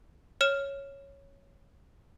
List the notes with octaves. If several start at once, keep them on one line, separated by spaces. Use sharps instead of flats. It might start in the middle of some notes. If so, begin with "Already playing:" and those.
C#5 F6 E7